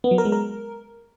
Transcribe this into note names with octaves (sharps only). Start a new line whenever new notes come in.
B3
F#3
A#4
G#3
A#4